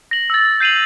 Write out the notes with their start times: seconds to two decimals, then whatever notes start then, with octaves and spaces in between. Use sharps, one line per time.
0.11 A#6 F#7
0.30 E6 A6
0.60 G6 C7 D#7 F7 F#7